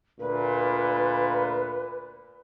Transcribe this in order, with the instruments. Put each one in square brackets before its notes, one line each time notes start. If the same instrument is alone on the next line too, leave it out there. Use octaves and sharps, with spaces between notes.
[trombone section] D2 A#2 [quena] B4